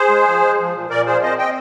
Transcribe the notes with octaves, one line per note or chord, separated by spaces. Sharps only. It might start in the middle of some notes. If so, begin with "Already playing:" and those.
Already playing: G#4 C5
G#3
F3
G#3
F3
A#2
A#2 A#4 D5
F3 G#4 C5
C4 C5 D#5
C4 D#5 G5